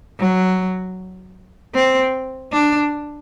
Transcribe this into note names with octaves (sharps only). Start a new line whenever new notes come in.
F#3
C4
D4